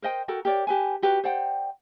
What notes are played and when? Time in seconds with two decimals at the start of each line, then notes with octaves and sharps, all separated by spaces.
0.02 A#4 C5 D#5 G5
0.28 F#4 A4 A#4 G5
0.45 G4 A#4 C#5 D5
0.67 G4 B4 G#5
1.02 F#4 G4 B4 G5
1.24 C5 D5 F#5 G5